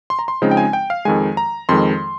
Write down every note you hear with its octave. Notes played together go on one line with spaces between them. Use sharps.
C6
A#5
C6
C#3 F3 G#3 C4 D#4
G5
G#5
G5
F5
F2 D#3 G#3 G#5
A#5
F2 D#3 G#3 C6